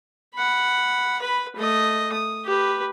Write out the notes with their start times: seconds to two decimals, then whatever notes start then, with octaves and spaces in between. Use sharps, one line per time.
0.35 F#5 B5
1.19 B4 B5
1.56 A3 D#5
2.13 D#6
2.45 G4 B4